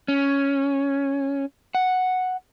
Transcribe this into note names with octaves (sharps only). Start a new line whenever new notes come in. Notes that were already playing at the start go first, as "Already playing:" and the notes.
C#4
F#5